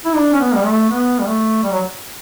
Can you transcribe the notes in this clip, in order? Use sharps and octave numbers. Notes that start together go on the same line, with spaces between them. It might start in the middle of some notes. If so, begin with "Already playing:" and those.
E4
D4
C#4
B3
G3
A3
B3
G3
A3
G3
F#3